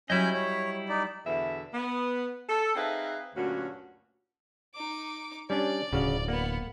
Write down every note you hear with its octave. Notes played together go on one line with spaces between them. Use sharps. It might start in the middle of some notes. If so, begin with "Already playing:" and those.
F#3 G3 C#4 E4 D#5 G#5 G6
C#5
D#4 D5
E2 B2 D3 E4 E5
B3
A4
C4 D#4 G#4 B4 E5 F5
D2 G2 A#2 F#3 C#4 F#4
D#4 D6
G3 C#4 D4 D5
D1 C#3 F#4 F5
A#3 B3 F#5